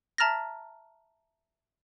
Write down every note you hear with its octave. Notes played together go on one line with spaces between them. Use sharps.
E5 A5 A#5 F6 A6 A#6